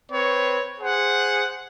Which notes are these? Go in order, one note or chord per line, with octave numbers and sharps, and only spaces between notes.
C4 B4 C#5
G#4 C5 F#5